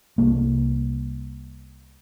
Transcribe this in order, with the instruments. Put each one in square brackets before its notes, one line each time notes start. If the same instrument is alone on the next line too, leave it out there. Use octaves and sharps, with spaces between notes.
[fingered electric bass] C2 A#3